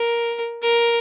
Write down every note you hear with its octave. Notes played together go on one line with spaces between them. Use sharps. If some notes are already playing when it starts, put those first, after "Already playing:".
Already playing: A#4
A#4